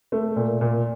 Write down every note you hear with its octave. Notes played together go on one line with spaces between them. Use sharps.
A3
A#2
A#2